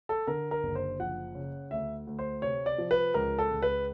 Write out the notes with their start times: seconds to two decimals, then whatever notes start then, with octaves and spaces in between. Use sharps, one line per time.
0.09 A4
0.27 D3 A#4
0.51 A#4
0.63 F#1
0.75 C5
0.99 F3 F#5
1.35 C#3
1.71 D2 E5
2.07 D2
2.19 C5
2.42 C3 C#5
2.66 D5
2.78 F3
2.91 B4
3.14 C#2 A#4
3.39 A4
3.50 C#2
3.62 B4